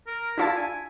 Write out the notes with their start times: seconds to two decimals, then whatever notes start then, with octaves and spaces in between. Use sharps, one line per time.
0.07 A#4
0.38 D4 E4 F4 A5
0.56 G#5